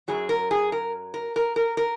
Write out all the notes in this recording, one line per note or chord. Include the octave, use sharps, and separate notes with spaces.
F#2 C#3 F#3 G#4
A#4
G#4
A#4
A#4
A#4
A#4
A#4